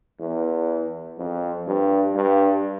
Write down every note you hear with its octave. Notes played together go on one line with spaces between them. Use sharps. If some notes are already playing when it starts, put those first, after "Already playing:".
E2
F2
G2
G2